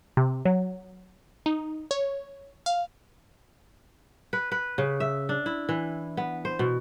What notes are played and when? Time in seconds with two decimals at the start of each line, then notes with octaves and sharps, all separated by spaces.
0.17 C3
0.45 F#3
1.46 D#4
1.91 C#5
2.66 F5
4.33 B4
4.52 B4
4.78 C#3
5.00 E5
5.29 D4
5.46 E4
5.69 E3
6.17 B3
6.45 C5
6.59 B2